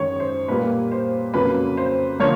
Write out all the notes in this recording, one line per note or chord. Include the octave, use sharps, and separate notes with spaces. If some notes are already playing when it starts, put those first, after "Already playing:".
Already playing: F#2 D#3 G#3 C#5
C5
A#2 G3 A#3 B4
C5
F2 C#3 F#3 A#3 B4
C5
D3 F3 A#3 C#5